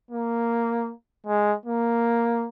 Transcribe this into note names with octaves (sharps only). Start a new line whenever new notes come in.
A#3
G#3
A#3